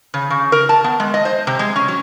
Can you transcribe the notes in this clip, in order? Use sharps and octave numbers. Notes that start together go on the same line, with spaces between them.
C#3
C#3
A#4
A5
B3
G#3
D#5
C5
C3
G#3
C#4
F#3